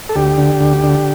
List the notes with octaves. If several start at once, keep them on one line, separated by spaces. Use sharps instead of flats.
A4
D2 G4
D3
D2
D3